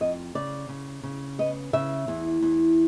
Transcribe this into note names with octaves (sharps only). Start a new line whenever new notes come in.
F2 D#5
C#3 D5
C#3
C#3
B3 D#5
C#3 E5
E2
E2